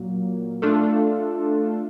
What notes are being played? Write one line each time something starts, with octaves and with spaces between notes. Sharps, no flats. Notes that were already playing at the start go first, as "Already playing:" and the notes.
Already playing: A#2 F#3 A#3
A3 D4 F4 A4